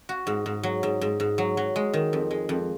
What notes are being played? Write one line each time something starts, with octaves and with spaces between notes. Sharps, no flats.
F#4
G#2
G#2
F#3
G#2
G#2
G#2
F#3
F#3
G#3
D#3
F2
G#3
F2